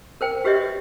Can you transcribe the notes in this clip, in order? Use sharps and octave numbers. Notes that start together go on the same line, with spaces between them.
A#4 C5 G5
F#4 G4 B4 C#5 D#5 E5
D#5